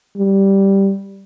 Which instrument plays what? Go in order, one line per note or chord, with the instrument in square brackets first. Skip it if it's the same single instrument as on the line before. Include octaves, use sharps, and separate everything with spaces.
[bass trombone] G3